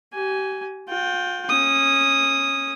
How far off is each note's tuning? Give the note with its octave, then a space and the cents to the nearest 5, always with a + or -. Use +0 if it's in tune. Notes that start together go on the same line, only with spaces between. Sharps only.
G4 -35 G#5 +0
F4 +40 G5 -5
C#4 -20 D#6 +0